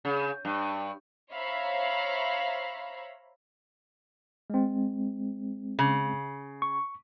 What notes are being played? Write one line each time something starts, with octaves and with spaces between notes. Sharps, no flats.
C#3
G2
C5 C#5 E5 F5 A#5 B5
G#3 C4
C#3
C#6